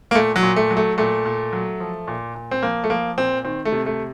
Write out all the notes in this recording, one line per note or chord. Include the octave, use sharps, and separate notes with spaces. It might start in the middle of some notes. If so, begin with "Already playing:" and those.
A#3
A#2 A3
F#3
A#2
A3
F#3
A3
A#2 A3
A#2
F#3
F3
A#2
A#2
C4
F3 A#3
A3
F3 A#3
A#2 C4
D#3 C4
A3
C3
A3